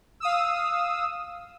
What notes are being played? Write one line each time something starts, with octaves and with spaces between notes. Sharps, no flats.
F5 D#6 E6